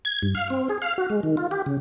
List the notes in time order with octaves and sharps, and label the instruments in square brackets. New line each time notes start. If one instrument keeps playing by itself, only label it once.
[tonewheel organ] G#6
G2
F5
C4
G#4
F5
F#4
G#3
D#3
F4
G4
C#3